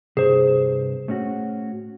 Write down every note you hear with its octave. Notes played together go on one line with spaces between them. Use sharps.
G2 C3 G#4 C5
A2 C#4 F#4